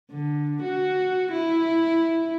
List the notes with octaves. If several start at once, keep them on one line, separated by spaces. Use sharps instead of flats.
D3
F#4
E4